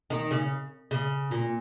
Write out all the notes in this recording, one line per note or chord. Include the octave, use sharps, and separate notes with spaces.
D#3
C#3
C#3
A#2